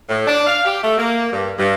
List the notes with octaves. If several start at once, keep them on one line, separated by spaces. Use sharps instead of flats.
A2
D4
F5
G4
A3
A#3
G2
G2